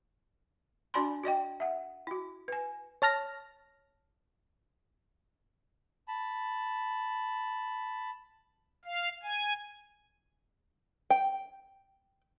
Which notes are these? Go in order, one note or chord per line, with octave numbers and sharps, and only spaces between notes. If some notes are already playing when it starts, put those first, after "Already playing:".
D4 F#4 D5 G#5 B5 C6
F#4 D5 D#5 G5
E5 F#5
E4 F#4
B4 G#5
C#5 A5 F6 A#6
A5 B5
F5
G#5
G5